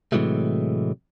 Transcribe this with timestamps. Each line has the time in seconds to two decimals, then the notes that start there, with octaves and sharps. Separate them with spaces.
0.12 A2 C3 E3 F#3 G#3 A3